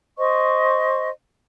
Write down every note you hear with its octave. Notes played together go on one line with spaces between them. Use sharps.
C5 D#5 C#6